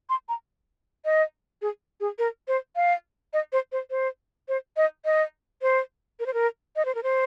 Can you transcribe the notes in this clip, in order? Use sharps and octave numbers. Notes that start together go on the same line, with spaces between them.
C6
A#5
D#5
G#4
G#4
A#4
C5
F5
D#5
C5
C5
C5
C5
D#5
D#5
C5
A#4
C5
A#4
D#5
C5
A#4
C5